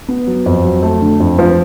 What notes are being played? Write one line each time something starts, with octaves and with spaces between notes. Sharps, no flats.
B3
F#3
F2
F#3
A3
D3
F2
F3